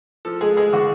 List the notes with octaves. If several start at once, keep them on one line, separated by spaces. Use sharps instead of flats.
F3 A4
G#3 G#4
G#3 G#4
D3 F#4